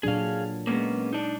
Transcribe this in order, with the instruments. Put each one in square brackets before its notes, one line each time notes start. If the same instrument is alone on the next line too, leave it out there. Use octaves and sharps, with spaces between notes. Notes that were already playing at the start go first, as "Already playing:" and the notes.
[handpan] A#2 F#3 D4 [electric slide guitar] G#4 F5
[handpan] G#3 [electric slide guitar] A#3 B3 C#4
[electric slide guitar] D4 D#4